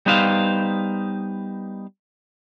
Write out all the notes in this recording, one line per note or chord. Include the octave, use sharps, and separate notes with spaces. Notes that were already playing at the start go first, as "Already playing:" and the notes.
G3 B3 D#4 B4 C5 F5